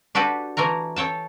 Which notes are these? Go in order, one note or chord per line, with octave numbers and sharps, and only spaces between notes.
D4 F#4 G4 A4 B4
E3 A3 A#4 A#5
A4 C#5 G5 A5